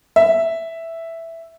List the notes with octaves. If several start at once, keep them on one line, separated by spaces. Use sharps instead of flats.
E5